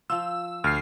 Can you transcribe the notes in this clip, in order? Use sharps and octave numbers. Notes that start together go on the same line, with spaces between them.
F3 F4 E6
D2 F6 C7